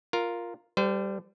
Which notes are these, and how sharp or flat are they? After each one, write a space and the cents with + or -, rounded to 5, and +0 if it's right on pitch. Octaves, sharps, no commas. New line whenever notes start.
F4 +0 A#4 +0
G3 +0 A4 +0 C5 -40